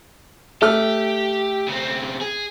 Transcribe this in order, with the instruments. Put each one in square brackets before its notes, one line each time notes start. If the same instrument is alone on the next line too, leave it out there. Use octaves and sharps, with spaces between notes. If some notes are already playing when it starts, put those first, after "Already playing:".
[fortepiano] A3 F6 [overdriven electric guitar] G4
[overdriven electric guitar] C#3 C4
G#4